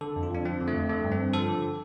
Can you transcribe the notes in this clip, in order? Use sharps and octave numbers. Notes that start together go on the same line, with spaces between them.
D3 A4
F2
F4
F2 D4
F3 C4
D3
A3
F2
D3 A3
G2
C4
G2
F3 A4
D3